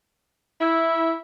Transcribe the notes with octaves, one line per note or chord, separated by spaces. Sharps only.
E4